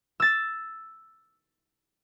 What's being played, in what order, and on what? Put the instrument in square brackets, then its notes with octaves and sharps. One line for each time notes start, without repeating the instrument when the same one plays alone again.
[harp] E6 A6